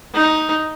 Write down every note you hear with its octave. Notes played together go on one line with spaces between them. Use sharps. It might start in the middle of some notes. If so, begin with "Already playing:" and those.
D#4